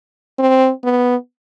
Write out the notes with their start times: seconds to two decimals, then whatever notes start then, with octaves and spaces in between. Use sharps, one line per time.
0.39 C4
0.84 B3